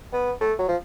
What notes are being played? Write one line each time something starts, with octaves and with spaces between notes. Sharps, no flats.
B3
A3
F#3
F3